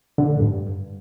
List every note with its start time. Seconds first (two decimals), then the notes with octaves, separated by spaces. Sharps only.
0.18 D3
0.29 A2
0.40 G2